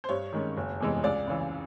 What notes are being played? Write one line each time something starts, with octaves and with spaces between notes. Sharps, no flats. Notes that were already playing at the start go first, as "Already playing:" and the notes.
C5
G2 C#5
D#3 G#3 C#4
F#1
E2 C3 E3 G#3
C#2 D5
C#3 E3